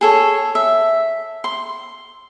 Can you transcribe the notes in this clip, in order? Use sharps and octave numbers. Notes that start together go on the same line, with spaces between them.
G#4 A4 C#5
E5
C6